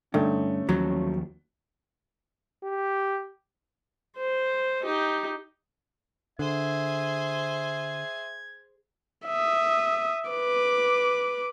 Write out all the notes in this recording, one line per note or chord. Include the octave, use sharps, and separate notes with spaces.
G2 D3 A3 C#4 D#4
D#2 F3 F#3
G4
C5
D#4 G4
D3 G#4 C5 E5 G#6
E5 D#6
B4 D6